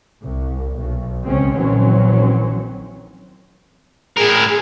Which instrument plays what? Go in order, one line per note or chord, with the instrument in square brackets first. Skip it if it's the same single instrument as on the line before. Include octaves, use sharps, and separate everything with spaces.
[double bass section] C2
B1
G1 C#2 C#3 C4 C#4
A#1 D#3 E3 F#3 C4 C#4
[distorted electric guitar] A2 A#4 [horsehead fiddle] G#4